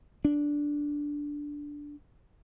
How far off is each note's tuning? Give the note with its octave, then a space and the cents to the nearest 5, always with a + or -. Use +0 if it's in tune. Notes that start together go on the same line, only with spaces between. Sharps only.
D4 -5